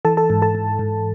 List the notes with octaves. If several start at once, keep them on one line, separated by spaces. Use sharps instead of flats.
E3 A4 A5
A4 A5
G#2
A4 A5
G#2
G#2